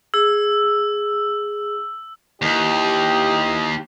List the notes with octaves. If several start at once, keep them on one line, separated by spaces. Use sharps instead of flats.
G#4 E6
D#2 E3 G4 D#5